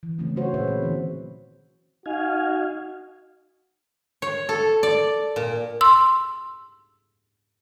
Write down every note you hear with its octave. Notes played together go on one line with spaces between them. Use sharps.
E3
C#3 E3 F#3 A3 C4 C#4
F#3 C#4 F#4 C5 C#5
A#2 C4 G#4 B4 E5
C#4
D#3 E3 C#4
D#4 F#4 F5 G#5
C#5
A4
D5
A#2
C6 E6